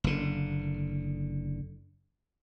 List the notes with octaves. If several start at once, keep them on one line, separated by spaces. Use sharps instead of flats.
F#1 D3